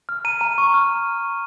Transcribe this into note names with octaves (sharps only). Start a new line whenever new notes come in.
F6
A#5 D#7
A#5
C#6
F6